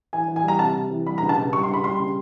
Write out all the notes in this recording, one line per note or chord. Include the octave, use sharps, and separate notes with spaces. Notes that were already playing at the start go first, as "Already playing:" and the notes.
E3 G#5
E3
G#5
G3 A#5
C3 A5
C3
E3
G3 B5
A#5
C#2
A5
C#2
G3 C#6
C6
C#2
B5
G3 C6
C#3